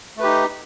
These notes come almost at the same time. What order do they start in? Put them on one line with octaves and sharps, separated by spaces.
A3 B4 G4 D#4